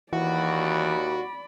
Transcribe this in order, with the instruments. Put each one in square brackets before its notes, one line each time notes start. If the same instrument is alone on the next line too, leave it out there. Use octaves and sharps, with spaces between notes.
[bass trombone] D#2 [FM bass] E3 [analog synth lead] F#4 [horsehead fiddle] D5 B5